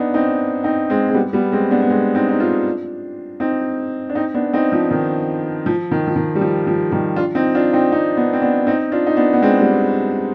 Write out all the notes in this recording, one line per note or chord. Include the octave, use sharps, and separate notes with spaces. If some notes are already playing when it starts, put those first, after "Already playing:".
Already playing: B3 D4 D#4
C4 D#4
C4 D#4
G#3 C4
G#3
G3 B3
G3 B3
G#3 C4
B3 D4
B3
G#3 C4
C4 D#4
D#4
D4 F4
C4 D#4
D4
C4 D#4
B3 D4
C4 D#4
F3
D#3
F3
D#3
F3
D#3
G3
F3
F3
D#3 G3
D4 F4
C4 D#4
D4 F4
C4 D#4
C4 D#4
B3 D4
C4
B3 D4
C4 D#4
D4 F4
D#4
B3 D4
B3
G#3 C4
G3 B3